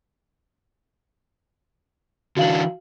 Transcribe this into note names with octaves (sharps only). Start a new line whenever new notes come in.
D3 E3 D4 F#4 F5 F#7